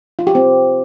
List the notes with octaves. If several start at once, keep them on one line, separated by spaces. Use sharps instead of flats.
F4
G4
C4